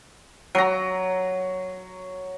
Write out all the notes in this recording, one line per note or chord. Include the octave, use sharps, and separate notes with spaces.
F#3 A#5